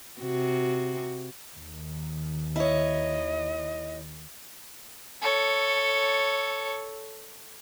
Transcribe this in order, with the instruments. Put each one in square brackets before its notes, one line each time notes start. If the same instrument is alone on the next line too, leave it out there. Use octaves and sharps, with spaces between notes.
[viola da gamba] C3 F#4
[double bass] D#2 D#3
[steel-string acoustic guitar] E4 C#5 [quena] D#5
[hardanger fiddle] A4 C#5